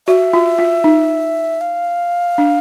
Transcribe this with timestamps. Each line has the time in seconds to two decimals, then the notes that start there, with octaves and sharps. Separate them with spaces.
0.07 F#4 E5
0.33 F4
0.59 F4
0.84 D#4
1.61 F5
2.38 D4